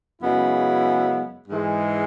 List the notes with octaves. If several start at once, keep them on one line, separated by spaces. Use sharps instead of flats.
F#2 C#3 G#3 B3 E4
G#2 E3 G#3